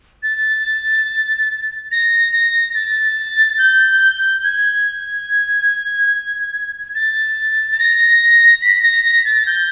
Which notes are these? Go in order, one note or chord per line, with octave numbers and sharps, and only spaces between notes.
A6
A#6
A#6
A6
G6
G#6
A6
A6
A#6
B6
A#6
A#6
A6
G6